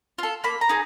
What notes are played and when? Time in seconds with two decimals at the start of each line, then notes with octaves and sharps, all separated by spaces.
0.19 F4 A4
0.44 A#3 B5
0.61 A#5
0.69 D#4 G#4